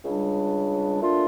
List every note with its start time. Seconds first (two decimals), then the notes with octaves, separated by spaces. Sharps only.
0.05 C#2 C#3 G3 D4
1.02 A#2 A3 D4 F4